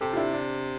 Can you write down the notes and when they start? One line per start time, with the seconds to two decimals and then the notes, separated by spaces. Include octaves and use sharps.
0.01 C3 G4 A4
0.13 F4
0.17 D4 E4
0.33 D4